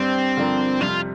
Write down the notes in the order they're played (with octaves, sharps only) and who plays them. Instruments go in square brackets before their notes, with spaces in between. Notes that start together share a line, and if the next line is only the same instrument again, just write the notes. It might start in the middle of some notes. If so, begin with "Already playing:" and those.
Already playing: [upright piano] G2 G3 D4 G4 C5 [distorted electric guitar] C4
[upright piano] G2 D3 F3 D4 A#4
[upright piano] F2 C3 G3 [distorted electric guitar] F4